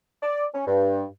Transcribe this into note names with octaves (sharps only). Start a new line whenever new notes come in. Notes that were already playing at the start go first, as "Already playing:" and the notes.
D5
C#4
G2